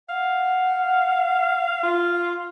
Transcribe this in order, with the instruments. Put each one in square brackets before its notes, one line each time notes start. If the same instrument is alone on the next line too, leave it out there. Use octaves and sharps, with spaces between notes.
[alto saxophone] F5 [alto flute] F#5
[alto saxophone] F4